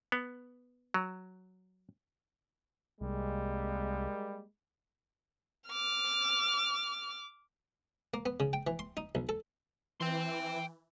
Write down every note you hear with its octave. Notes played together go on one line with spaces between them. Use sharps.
B3
F#3
C2 G3 G#3 A#3
D6 F6
A#3
B3
C#3
G5
E3
C6
D#4
B1
A4
E3 G5 C6